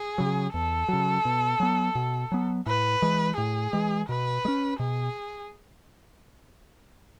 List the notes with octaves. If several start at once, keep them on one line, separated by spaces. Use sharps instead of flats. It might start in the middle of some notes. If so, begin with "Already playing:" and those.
Already playing: G#4
C#3 F#3
E2 A4
C#3 F#3
B2
F#3 B3
B2
F#3 B3
A2 B4
E3 G#3
A2 G#4
E3 G#3
B2 B4
G#3
C#4
B2 G#4